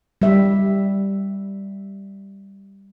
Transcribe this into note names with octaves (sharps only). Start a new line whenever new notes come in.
G3 E5